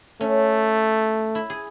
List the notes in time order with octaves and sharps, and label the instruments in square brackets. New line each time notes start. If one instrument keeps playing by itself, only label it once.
[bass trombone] A3 [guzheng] C#4
[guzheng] E4
G#4